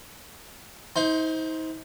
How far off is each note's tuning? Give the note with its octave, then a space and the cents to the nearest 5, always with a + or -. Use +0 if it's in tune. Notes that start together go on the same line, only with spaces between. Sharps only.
D#4 +40 C5 +0